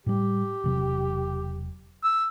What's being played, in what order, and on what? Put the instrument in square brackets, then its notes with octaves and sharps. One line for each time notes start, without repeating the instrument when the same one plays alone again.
[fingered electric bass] A2 G3 [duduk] G4
[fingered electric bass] E1 C3 F#3
[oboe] E6